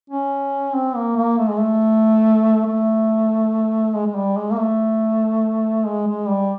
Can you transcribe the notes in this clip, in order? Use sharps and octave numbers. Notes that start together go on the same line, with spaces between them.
C#4
C4
A#3
A#3
A3
G#3
A3
A3
G#3
G#3
G3
G#3
A#3
A3
G#3
G#3
G3